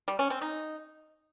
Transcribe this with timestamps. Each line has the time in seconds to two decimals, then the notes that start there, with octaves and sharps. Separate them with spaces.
0.08 G3
0.19 C#4
0.30 C4
0.42 D#4